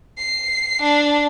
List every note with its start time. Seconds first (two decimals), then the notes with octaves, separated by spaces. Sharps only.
0.18 C7
0.82 D4